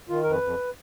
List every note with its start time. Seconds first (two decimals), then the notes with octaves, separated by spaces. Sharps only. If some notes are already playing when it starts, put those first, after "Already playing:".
0.09 D#3 F4
0.23 F2 A#4
0.31 B4
0.42 F2